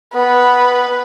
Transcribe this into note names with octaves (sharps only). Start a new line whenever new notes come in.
B3 B4